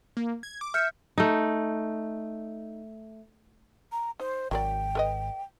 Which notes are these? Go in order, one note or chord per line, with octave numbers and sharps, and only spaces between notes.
A#3
G#6
D6
E5 F6 G6 C#7
A3 D#4
A#5
D#4 C5
G#1 F#3 A#4 D5 G5
A4 B4 D#5